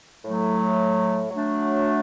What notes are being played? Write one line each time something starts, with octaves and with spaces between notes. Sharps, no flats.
A2 F#3 A3
F#3 A3 D4